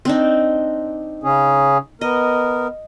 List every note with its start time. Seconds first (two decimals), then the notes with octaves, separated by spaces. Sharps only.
0.05 C4 D4 D#4
1.23 C#3 C#4 G#4
2.01 B3 A#4 D#5